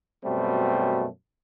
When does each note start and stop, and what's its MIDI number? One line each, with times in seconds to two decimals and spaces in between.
0.25 1.07 42
0.25 1.07 47
0.25 1.07 55
0.25 1.07 57
0.25 1.07 60